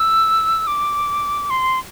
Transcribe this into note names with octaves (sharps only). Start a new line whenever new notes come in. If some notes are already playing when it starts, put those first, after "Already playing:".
Already playing: E6
D6
C6